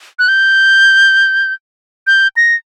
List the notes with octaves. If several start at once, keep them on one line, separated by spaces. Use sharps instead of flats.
F#6
G6
G6
A#6